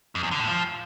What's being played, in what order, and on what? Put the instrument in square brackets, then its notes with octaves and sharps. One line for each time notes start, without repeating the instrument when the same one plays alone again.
[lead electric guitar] F2
E2
D3
A2
F3